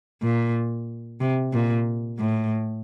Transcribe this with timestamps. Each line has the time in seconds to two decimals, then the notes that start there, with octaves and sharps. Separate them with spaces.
0.22 A#2
1.21 C3
1.53 A#2
2.19 A2